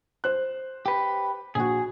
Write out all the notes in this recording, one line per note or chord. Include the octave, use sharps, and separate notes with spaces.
C5 F#6
G4 B4
A#1 F#4 G#4